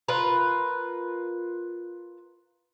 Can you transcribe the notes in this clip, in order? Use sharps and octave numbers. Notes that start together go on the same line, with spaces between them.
F4 A#4 B4